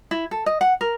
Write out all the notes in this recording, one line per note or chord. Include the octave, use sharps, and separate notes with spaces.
E4
A4
D#5
F#5
A#4